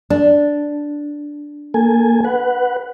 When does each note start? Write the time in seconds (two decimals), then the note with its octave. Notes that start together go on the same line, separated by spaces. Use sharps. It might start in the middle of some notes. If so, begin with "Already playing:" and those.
0.10 D4
1.74 A#3 A4 G#5
2.25 B4 F#5